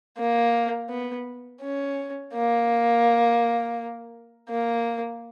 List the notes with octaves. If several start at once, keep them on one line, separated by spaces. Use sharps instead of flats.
A#3
B3
C#4
A#3
A#3